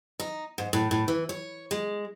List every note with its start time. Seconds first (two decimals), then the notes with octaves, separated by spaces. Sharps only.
0.20 D#4
0.58 G#2
0.73 A2
0.91 A2
1.08 E3
1.29 C#5
1.71 G#3